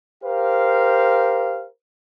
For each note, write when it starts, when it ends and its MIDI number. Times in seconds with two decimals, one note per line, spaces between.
0.23 1.65 67
0.23 1.65 70
0.23 1.65 72
0.23 1.65 77